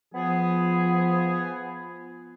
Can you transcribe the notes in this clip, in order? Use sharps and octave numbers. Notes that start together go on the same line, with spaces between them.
F3 B3 G#4